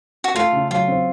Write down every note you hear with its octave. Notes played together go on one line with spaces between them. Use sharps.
F#4
A3 F4
C#3
F#3 F4
C4